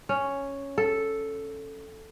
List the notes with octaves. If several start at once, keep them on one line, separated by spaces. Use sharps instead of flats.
C#4
A4